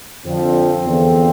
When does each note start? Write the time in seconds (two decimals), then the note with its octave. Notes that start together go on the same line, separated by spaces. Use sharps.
0.24 F2 D3 F3 C4
0.83 E2 D3 F3